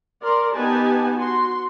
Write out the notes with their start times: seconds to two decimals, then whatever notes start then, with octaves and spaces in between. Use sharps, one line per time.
0.23 A#4 D5 C6
0.54 B3 D#4 G4 B4 G#5 A5
1.16 F#4 C6